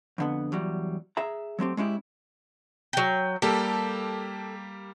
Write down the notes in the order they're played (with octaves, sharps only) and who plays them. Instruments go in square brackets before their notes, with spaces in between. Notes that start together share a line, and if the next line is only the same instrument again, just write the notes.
[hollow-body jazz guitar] F2 D3 B3
E2 F#3 G3
G#4 E5 A#5
F#3 A3 C4 G4
G#3 C#4 E4 G4
[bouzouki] F#3 G5
[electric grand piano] G3 A#3 G4 [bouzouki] A4